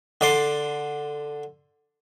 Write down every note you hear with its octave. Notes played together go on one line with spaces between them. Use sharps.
D3 D5 C6